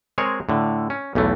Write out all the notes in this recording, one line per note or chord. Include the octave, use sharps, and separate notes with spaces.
G#3 C4 G#4 A#4 C#5
A2 D3
C#4
B1 E2 E3 A3